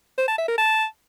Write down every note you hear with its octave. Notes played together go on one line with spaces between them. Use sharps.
C5
A5
E5
A#4
A5